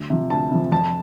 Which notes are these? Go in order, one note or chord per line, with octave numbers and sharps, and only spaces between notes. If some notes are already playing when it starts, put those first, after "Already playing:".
Already playing: D2
C3 F3
D2 A5
C3 F3
F2 A5